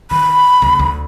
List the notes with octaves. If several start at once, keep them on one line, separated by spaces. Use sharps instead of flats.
D#3 B5
D2 C#3
D2